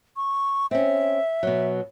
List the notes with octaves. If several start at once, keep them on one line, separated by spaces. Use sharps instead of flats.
C#6
C4 C#4 E5
B2 F#3